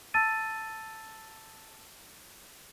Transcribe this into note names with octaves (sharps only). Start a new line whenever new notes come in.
A5 E6 A6 D#7